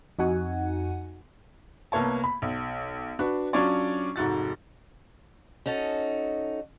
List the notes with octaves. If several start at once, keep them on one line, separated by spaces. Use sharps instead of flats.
F2 D#4 F#4 F#5 G#5
C2 A#3 B3 C#5 A5
B5
B1
D4 F#4 B4
F#3 C#4 D4 F4 C#5 D5
F1 G#2 F#4 A6
C#4 D#4 F#4 A4